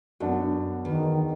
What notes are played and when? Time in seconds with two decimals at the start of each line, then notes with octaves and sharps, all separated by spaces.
0.20 F#2 B3 D4 F#4
0.85 E2 D#3